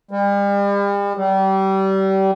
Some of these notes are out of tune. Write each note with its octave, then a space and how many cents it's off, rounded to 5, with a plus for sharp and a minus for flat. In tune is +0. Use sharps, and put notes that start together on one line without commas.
G3 +40
G3 -30